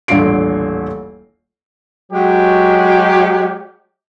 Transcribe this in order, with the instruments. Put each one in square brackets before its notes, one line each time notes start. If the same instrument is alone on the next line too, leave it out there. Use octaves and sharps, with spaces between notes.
[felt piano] D#1 A1 D3 F4 C7 D7
[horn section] F#3 G#3 G4